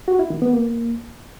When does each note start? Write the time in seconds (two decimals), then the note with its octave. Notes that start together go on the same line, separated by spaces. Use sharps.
0.08 F#4
0.19 E4
0.30 D#3
0.42 B3
0.53 A#3